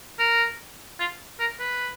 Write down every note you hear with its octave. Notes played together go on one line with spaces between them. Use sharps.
A#4
F4
A#4
B4